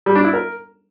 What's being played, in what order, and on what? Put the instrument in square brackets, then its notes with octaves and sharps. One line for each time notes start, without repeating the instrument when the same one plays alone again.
[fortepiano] G3
D4
E4
A#4